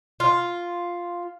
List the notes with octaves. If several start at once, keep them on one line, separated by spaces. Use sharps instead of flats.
F4